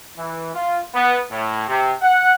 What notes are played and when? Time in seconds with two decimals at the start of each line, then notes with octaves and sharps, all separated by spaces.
0.16 E3
0.54 F4
0.94 B3
1.30 A2
1.67 C3
2.01 F#5